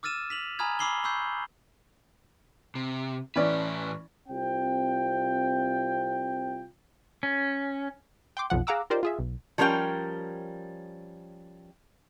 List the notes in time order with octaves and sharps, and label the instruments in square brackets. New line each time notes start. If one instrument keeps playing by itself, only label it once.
[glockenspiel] D6 E6 F6 A6 D#7 E7
B6 F7 F#7
G#5 A#5 B5 D#6 F6 G#6
B5 D6 E6 C7 F#7 G7
B5 C#6 E6 G6 C7
[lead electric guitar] C3
[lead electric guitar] A2 B4 [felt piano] E3 C#4 D5
[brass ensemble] C2 C4 F4 G5
[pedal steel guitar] C#4
[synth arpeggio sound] G5 C6 D6
B1 F2 F3 F#5
G#4 F5 F#5 A#5 D6 E6
D#4 F4 G4 A#4 C5 D5
F4 G#4 E5
B1
[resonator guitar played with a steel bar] F3 G3 C#4 A#4 G5